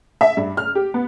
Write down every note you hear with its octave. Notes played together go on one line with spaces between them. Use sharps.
E5
G2
F6
G4
B3